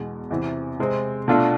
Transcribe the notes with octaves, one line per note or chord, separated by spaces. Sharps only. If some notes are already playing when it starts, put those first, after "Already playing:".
Already playing: E2 B2 G#3
E2 C3 E3
C3 G#3 C4
B2 A3 D4 F4 A4